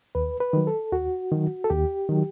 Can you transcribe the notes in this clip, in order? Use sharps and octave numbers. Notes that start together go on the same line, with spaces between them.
D#2 B4
B4
D#3 F#3
A4
D#2 F#4
D#3 F#3
A4
D#2 G4
D#3 F#3